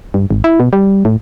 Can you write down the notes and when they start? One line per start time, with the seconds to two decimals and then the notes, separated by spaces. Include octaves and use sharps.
0.14 G2
0.31 G#1
0.44 E4
0.60 B2
0.73 G3
1.05 A2